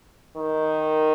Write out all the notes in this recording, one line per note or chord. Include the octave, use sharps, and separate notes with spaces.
D#3